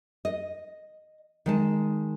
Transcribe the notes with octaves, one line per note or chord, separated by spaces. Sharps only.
D#5
D#3 G#3 A5